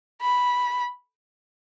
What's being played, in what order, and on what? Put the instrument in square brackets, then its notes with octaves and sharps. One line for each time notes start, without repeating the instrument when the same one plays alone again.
[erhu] B5